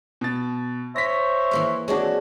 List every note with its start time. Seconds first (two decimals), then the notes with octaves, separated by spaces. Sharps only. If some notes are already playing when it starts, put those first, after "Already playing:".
0.21 B2 A6
0.96 C5 C#5 E5 A#6 B6
1.51 E3 A#3 F5
1.88 G#3 C4 D4 F#4 C#5